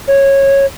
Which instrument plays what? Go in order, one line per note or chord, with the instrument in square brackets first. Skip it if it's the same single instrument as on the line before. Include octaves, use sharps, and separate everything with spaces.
[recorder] C#5